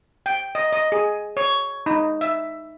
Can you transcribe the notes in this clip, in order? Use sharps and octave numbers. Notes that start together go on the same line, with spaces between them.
G5
D#5
D#5
G#4
C#5
D#4
E5